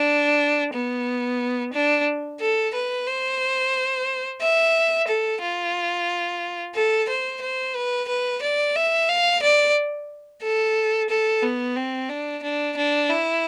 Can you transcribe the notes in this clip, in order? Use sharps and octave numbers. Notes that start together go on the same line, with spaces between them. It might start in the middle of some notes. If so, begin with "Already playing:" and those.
Already playing: D4
B3
D4
A4
B4
C5
E5
A4
F4
A4
C5
C5
B4
B4
D5
E5
F5
D5
A4
A4
B3
C4
D4
D4
D4
E4